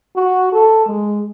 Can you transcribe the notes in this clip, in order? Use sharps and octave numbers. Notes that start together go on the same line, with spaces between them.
F#4
A4
G#3